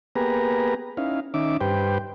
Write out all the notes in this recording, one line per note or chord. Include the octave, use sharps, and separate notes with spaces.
A#3 B3 G4 G#4 B4 A#5
C#4 D#4 E4 F5
D#3 C#4 D#4 E5 D6
G2 G4 B4 C5 G5